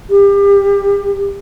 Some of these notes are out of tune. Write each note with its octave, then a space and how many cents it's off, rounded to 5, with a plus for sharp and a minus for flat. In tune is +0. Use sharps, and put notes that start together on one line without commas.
G4 +30